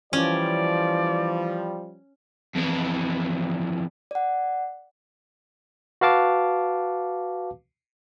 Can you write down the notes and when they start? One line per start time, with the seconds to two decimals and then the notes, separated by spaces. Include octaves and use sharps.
0.13 E3 F3 G3 C#4 D5
2.55 F2 E3
4.11 D5 F#5
6.01 F#4 B4 F5 A5 D6